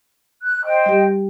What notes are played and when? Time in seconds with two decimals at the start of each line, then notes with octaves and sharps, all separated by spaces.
0.42 F#6
0.64 C5 D#5 G5
0.86 G3 G4